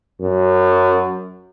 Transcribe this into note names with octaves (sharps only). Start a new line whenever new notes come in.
F#2